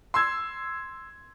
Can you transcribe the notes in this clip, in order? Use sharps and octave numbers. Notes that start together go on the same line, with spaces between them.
C6 E6 G#6